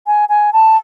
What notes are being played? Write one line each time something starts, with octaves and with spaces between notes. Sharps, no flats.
G#5
G#5
A5